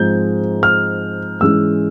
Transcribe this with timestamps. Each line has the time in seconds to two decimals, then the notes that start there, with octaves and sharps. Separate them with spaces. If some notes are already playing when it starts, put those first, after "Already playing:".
Already playing: G#2 F3 G#3 C4 G6
0.63 F6
1.41 G#2 E3 G#3 C#4 E6